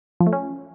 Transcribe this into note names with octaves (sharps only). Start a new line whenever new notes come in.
F3
A3
C#4